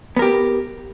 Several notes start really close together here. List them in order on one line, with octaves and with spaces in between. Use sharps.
B3 A#4 G4